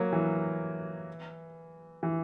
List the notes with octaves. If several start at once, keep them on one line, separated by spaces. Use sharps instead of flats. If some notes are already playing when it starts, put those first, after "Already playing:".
Already playing: F#3 A#3
E3
E3